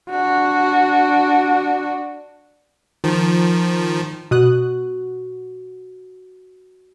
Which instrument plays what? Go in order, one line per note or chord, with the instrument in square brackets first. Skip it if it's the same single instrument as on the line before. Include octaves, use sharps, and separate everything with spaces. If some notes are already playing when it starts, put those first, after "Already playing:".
[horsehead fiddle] D4 F#4
[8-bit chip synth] D#3 F3
[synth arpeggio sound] B2 D#6 F#6 [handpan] F#4